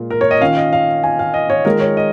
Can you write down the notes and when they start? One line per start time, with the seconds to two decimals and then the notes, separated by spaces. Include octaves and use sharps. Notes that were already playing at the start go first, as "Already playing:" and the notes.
Already playing: A#2 G#3 F4
0.10 A#4
0.21 C#5
0.31 D#5
0.41 D#3 C#4 F4 F5
0.57 D#5
0.73 F5
1.04 G#5
1.19 F5
1.34 D#5
1.50 C#5
1.65 D#3 G#3 F4 A#4
1.80 C#5
1.97 D#5